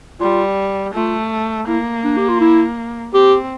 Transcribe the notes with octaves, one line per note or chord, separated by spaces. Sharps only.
G3 F4
A3 F4
A#3 E4
D4
G4
F4
E4
C4 G4